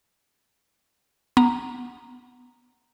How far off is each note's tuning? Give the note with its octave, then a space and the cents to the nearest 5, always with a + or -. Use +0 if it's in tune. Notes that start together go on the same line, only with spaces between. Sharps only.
B3 +0 A#5 +0